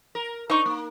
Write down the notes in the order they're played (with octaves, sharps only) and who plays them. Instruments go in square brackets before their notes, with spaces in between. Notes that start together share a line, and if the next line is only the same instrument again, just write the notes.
[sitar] A#4
[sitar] D4 D#4 [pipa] C5 C#6
[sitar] A#3